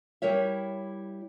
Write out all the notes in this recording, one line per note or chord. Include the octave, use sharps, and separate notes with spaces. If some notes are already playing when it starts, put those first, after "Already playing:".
G3 E4 A#4 C#5 E5